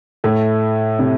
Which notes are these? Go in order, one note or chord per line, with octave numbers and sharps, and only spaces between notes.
A2 A3
C3